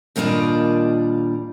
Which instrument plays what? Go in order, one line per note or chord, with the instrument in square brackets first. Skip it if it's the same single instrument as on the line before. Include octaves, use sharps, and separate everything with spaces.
[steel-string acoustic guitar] D#2 A#2 G3 D4 F4 D#5